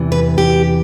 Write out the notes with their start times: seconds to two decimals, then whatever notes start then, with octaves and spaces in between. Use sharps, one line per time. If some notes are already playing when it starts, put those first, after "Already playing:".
Already playing: E2 C3 E3
0.12 B4
0.38 G4